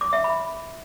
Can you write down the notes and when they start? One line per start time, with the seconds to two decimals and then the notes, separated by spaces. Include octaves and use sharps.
0.01 D6
0.13 E5
0.24 B5